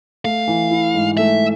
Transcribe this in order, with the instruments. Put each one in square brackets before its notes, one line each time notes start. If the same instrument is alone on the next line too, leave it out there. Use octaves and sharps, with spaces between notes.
[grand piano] A3 [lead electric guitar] F5
[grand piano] E3
E4
G#2
[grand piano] A3 [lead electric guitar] E5